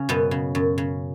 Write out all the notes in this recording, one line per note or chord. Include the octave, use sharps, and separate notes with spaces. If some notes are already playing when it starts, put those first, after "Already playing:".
Already playing: C#3 C#4
F#2 B2 B3
C#3
F#2
C#3